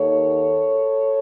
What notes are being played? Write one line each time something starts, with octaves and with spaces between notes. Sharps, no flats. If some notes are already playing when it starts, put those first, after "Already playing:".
Already playing: D#2 D#3 A4 C#5